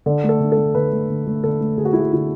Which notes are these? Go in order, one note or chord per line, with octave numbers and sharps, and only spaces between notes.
D3 A4
A3
A4
D3
A4
A3
D3 B4
A3
D3
A3
D3 A4
A3
D3 G#4
F#4
E4
A3 F#4
D3 E4